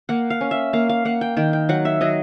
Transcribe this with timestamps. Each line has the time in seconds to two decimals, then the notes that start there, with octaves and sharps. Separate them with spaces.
0.09 A#3 F#5
0.30 F5
0.41 C#4
0.51 E5
0.73 A#3 F5
0.89 F5
1.05 A#3 F#5
1.21 G5
1.37 D#3 G5
1.53 G5
1.69 F#3 F#5
1.85 E5
2.01 F#3 D#5